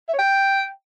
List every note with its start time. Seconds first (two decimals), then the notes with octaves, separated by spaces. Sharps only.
0.08 E5
0.13 C#5
0.18 G5